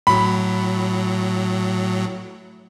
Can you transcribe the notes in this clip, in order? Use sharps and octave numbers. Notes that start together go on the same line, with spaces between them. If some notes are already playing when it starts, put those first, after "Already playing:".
A2 F#3 B5